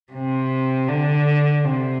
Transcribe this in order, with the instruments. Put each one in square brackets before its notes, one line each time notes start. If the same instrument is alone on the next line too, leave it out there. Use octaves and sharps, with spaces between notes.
[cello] C3
D3
C3